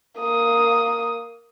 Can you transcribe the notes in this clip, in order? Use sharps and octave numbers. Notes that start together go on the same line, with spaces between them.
A#3 D#6